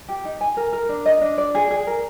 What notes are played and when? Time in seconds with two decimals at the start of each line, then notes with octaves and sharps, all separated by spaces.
0.09 G4
0.25 D#4
0.41 G#5
0.57 A#4
0.73 A#4
0.89 D4
1.06 D#5
1.22 D4
1.38 D5
1.55 G#4
1.71 G#4
1.87 A#4